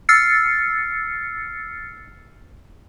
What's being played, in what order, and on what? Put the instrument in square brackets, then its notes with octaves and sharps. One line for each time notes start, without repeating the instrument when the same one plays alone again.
[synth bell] E6 F6 A6 C7 C#7